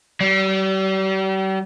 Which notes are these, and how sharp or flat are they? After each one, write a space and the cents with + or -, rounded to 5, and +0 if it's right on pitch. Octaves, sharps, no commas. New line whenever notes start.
G3 -40